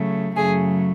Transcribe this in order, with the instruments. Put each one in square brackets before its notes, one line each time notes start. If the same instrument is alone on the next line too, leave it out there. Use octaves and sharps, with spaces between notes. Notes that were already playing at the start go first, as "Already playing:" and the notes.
Already playing: [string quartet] C#3 F#3 A3
F#2 C#3 F#3 A3 G#4